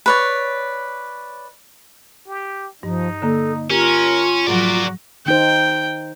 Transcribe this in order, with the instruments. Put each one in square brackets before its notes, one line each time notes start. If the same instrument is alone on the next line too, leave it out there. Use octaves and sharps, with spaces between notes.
[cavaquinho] B4 C#5 D5
[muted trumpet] G4
[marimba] G2 [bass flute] F3 [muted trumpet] D#4
[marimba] D3 A#3 [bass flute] A4
[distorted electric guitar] C#4 [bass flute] F4 [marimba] G4 [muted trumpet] A#4
[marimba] G#2 F3 F#3 [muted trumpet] F#4 [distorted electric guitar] A#4 D5
[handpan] D#3 D#4 C5 [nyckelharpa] G5